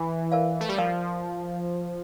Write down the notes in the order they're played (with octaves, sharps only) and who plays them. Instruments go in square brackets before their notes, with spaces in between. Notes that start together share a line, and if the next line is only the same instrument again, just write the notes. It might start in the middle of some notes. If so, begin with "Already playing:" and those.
Already playing: [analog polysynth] E3
[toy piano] A#4 D5 F5 A5
[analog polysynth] A3
G3
[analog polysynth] F3 [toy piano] A#4 D5 F5 A5